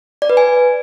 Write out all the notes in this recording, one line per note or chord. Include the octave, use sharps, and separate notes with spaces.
D5
B4
G#5